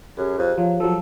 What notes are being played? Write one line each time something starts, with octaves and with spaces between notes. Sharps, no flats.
F#2 G4 G#4
F2
F3 F#3 F5
F3 F#3 A4